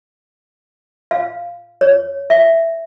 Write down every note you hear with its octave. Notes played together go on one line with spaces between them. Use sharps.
F5
C#5
E5